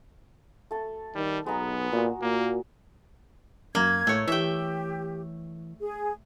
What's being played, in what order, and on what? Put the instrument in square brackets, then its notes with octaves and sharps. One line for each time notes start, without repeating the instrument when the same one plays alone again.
[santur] A3 A4
[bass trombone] D#3 [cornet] G3
[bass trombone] B1 [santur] G#3 A#5 [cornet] B3
[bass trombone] A#2 [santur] F#4
[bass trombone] A#2 [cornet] A#3
[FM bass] F#2 [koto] A#3 [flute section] G#6
[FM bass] A2 [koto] A3 C#5
[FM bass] E3 [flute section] G4 [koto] E5 G5
[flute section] G#4